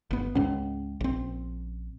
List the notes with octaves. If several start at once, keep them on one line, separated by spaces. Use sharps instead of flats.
G1 B3
C#2 G#2 C#4
A#1 C4